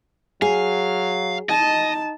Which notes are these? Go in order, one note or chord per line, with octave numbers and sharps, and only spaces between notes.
F#3 G#4 F5
D#4 D#5 A5